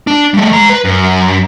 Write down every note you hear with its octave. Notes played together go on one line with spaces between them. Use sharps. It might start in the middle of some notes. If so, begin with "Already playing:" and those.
D4
G3 A3
G#3 A#5
B4
F#2